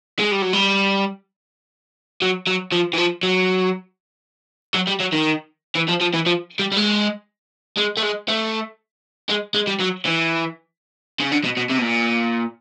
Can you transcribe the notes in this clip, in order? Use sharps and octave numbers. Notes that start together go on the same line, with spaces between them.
G#3
G3
F#3
G3
F#3
F#3
F3
E3
F3
F#3
F#3
G3
F#3
D#3
E3
F3
F3
E3
F3
G3
G3
G#3
G#3
A3
G#3
A3
G#3
G#3
G3
F#3
E3
C#3
D3
B2
B2
C3
B2
A#2